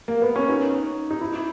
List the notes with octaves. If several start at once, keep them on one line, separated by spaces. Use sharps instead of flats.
A#3
B3
C#4
D#4
D#4
E4